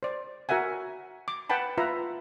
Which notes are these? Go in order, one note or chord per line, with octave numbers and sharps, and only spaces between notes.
C5 D5
F#4 A#4 E5 F#5 G#5
D6
B4 F#5 G5 A5 B5
F4 B4 E5 A#5